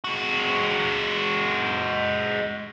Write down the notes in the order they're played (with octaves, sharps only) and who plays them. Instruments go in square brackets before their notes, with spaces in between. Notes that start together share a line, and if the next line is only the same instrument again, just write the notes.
[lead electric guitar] G#3 F#4